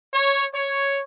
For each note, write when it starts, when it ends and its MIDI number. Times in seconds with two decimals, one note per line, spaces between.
0.14 0.46 73
0.54 1.02 73